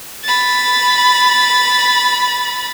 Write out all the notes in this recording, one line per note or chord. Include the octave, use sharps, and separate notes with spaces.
B5 A6